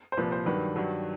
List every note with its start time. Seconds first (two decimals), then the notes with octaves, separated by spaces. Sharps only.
0.12 C5
0.17 C2 A#2 F3 B4
0.32 C5
0.46 G2 D#3 F#3 B4
0.76 G2 D#3 F#3